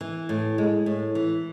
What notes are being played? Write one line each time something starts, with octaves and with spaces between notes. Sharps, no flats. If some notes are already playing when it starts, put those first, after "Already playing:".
E3
A2
G#3
A2
E3